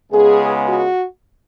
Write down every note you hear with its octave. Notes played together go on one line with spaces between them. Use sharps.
C#2 C#3 G#3 B3 G#4
F#4